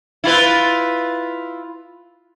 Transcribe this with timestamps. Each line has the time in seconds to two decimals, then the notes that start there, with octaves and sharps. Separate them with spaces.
0.24 E4 F4 B4